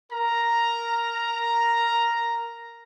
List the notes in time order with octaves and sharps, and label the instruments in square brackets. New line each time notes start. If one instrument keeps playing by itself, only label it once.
[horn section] A#4 A#5